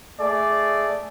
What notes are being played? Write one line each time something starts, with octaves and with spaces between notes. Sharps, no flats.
A3 G#4 D5